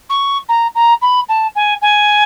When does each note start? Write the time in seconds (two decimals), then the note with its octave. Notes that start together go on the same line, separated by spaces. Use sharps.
0.09 C#6
0.49 A#5
0.75 A#5
1.02 B5
1.29 A5
1.55 G#5
1.82 G#5